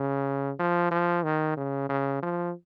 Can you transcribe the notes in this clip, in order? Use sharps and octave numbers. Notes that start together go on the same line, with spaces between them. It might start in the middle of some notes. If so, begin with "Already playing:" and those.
Already playing: C#3
F3
F3
D#3
C#3
C#3
F3